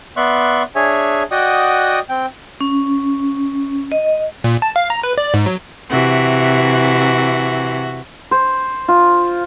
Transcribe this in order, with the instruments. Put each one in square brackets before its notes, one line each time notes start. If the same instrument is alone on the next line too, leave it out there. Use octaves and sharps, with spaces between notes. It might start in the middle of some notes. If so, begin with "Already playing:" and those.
[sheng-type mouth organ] B3 D5 E5 C6 C#6 F#6
D4 G#4 C#5 E5 G#5
F#4 D5 D#5 F#5 G5 D#6
C4 G5
[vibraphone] C#4
D#5
[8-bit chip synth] A#2
A5
F5
A#5
B4
D5
G#2
F#3
[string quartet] C3 E3 [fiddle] F#4 E5
[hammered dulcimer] C5
F4